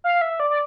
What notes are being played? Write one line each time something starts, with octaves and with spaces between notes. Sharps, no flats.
F5
E5
D5
D5